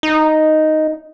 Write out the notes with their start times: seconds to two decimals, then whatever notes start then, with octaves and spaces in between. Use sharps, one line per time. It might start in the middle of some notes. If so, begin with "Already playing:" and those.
0.03 D#4